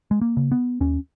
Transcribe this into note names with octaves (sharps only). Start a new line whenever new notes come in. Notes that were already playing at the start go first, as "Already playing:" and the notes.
G#3
A#3
C#3
B3
D#2 C#4